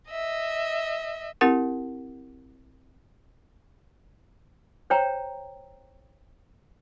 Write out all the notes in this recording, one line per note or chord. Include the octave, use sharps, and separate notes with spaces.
D#5 E5
C4 E4 G4 A#4 F#5
C5 C#5 G5 A#5